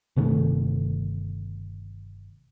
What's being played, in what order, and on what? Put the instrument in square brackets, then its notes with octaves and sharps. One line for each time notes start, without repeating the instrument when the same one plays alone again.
[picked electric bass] G1 C3 D#3 A3